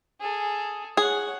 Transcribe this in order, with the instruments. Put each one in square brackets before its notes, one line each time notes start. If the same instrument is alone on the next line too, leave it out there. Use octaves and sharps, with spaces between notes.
[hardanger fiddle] G#4 A4
[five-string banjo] G#4 [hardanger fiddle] C#5 F#5